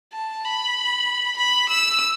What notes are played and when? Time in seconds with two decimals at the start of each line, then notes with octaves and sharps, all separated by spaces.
0.13 A5
0.45 B5
1.38 B5
1.70 E6